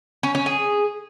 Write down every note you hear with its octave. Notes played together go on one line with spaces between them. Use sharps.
C#4
C#4
G#4